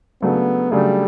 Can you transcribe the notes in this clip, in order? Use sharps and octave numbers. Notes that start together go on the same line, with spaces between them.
C#3 F#3 A3 B3 D4
C#3 F#3 G3 A3 D4